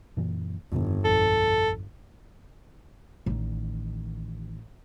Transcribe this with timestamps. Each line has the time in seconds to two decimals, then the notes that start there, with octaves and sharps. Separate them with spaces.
0.17 F#2 A#2 E3
0.72 G1 F2 D#3 B3
1.05 A#1 F2 A4
3.26 A1 D#3